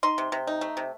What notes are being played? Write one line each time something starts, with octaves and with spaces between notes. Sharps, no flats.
D#4 C6
C3
C3
D#4
A3
C3